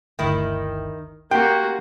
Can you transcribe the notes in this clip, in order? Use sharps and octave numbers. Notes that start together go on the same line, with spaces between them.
G1 D2 D#3 E4 G5
A#3 F#4 G4 G5 C6